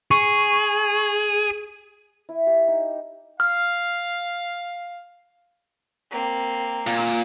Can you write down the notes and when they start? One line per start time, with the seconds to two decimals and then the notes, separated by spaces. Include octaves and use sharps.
0.11 G#4 C#6
2.29 E4
2.47 G4
2.68 D#4
3.40 F5 F6
6.11 A#3 C4
6.87 A#2